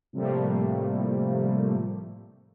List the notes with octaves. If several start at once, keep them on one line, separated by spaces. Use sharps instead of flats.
A2 C3 F3 G3 A3 A#3